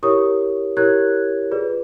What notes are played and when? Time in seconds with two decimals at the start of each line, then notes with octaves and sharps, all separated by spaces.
0.03 E4 G4 A#4 C#5 C#6 D#6
0.77 E4 G4 A#4 C#5 F#6 G#6
1.51 F4 G#4 B4 D5